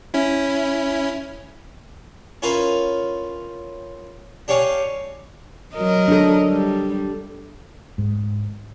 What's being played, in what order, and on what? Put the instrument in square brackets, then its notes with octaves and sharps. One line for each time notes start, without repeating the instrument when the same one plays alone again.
[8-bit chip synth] C#4 E4
[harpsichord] C#4 E4 F4 A#4 B4
D4 G4 C#5 F5 G#5
[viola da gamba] F#3 A#4 D#5
[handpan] D4 A4
[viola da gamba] G3
[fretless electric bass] G#2